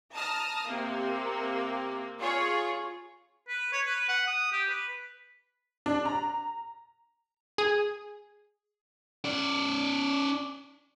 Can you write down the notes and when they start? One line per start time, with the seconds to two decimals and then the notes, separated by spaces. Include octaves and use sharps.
0.14 A5 A#5 D#6 F6
0.66 C3 A#3
2.20 F4 G#4 C#5
3.48 B4
3.73 C#5
3.86 B4
4.09 F#5
4.27 D#6
4.52 G4
4.69 B4
5.86 D4
6.05 A#5
7.58 G#4
9.24 C#4 D5